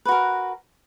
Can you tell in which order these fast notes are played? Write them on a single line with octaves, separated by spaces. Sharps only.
B4 F#4 A#4